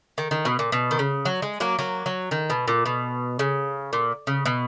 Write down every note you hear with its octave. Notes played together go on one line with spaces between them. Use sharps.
D#3
D#3
B2
A#2
B2
D#3
C#3
F#3
G#3
F#3 A#3
F#3 A#3
F#3
D#3
B2
A#2
B2
C#3
A#2
C#3
B2